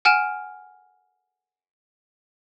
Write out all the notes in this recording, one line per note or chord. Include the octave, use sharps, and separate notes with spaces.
F#5 G#5 F6 D7 E7